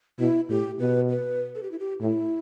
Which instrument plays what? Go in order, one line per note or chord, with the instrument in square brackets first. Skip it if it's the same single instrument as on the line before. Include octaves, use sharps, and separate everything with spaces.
[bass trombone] B2 [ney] E4
[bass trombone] A2 [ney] G4
[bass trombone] B2 [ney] B4
[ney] B4
A4
G4
E4
G4
[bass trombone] A2 [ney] E4